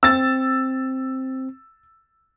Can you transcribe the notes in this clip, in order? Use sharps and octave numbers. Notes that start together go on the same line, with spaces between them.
C4 E6 A6